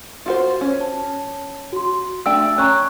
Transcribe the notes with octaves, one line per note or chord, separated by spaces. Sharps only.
F4 F#4 C5
C#4
A5
F#4 C6
A3 D4 G5 E6
C#4 A#5 C#6 F#6